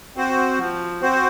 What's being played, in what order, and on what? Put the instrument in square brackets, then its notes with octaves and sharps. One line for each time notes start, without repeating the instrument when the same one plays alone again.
[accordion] C4 F#4 C5
F3
C4 F#4 C5